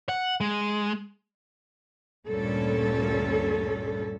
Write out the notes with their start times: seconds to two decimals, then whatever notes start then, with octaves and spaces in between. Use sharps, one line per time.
0.09 F#5
0.41 G#3
2.28 D2 G2 A#2 G3 C#4 A4